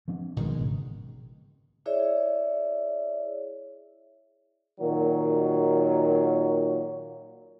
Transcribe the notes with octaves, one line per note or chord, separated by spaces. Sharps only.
F3 C4 D4
B1 B2 D#3 F3 G#3 B3
G#1 C#3
E4 G#4 C#5 D5 E5
A#2 D#3 F#3